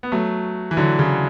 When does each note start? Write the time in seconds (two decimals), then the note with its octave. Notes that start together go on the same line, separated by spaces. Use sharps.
0.03 B3
0.12 F#3 A3
0.71 E3
0.77 D3 F#3
0.99 C#3 E3